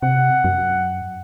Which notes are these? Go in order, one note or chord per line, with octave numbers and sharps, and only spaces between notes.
C3 F#5
F#2